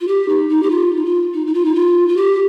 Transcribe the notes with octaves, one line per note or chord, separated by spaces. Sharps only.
F4
G4
D#4
D#4
G4
F4
D#4
F4
D#4
D#4
F4
D#4
F4
F4
G4